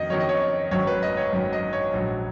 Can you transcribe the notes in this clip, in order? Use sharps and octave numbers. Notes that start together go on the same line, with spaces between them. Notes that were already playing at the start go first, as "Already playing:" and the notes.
Already playing: F2 D#3 F#3 D#5
F2 D#3 F#3 C#5
D#5
C#5
G#1 F#2 D#3 F#3 C#5
B4
D#5
C#5
G#1 F#2 D#3 F#3
D#5
C#5
A#1 G#2 F#3